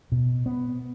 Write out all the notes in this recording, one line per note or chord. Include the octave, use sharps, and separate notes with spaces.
B2
B3